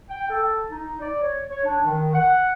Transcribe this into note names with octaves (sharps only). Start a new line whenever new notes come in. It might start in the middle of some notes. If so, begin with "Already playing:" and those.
G5
A4
D#4
D5
C#5
C#5
D4
D#3
F#5